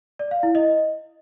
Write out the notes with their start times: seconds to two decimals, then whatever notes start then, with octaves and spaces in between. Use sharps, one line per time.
0.19 D5
0.31 F5
0.43 E4
0.55 D#5